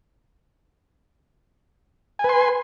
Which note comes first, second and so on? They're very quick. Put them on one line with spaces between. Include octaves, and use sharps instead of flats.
G#5 B4 C6